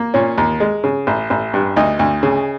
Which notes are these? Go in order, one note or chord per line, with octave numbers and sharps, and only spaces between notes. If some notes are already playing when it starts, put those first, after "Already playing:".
Already playing: A#3
A#2 C#4
D#2
G#3
C#3
A1
A1
G2
D2 D#4
D2
C#3